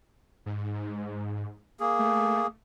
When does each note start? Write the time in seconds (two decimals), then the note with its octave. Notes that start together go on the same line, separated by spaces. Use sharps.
0.46 G#2
1.80 A#3 G#4
1.99 A3